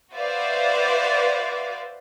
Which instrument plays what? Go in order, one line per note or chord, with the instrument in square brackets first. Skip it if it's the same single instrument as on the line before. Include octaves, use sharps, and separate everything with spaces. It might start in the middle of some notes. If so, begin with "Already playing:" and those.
[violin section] F#4 B4 C5 D5 E5 F5